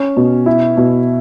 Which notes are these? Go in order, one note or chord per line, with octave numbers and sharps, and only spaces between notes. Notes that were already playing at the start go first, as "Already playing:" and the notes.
Already playing: C#4
B2
E4
B2